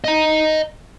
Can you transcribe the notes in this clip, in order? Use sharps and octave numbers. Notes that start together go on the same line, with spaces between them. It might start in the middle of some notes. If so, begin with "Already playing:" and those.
D#5 A#5